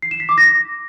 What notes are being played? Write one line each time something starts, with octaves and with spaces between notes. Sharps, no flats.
C7
E7
B6
D6
A#6